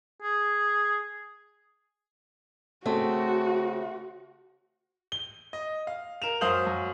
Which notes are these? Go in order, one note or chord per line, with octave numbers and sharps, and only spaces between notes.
G#4
C#3 A3 C4 F#4
G7
D#5
F5
A#4 E7 F7
F#2 C5 F5 D#6 G6 F#7
F#2